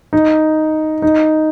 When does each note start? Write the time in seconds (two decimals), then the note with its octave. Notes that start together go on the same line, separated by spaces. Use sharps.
0.13 D#4
1.02 D#4